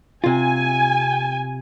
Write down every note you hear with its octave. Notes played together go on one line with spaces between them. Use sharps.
C3 F4 G#5